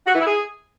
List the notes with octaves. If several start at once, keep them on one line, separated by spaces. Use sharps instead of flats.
F#4
E3
E4
G#4